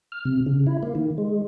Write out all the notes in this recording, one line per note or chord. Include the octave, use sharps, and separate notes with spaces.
F6
C3
C#3
E4
A#3
D#3
G#3